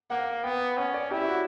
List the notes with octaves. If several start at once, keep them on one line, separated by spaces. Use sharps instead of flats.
A#3 F#5
B3 G5
C#4 F#5
D5
E4 G4
F#4